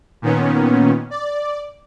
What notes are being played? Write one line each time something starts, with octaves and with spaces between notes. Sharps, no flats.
A#2 D#3 B3 C#4
D5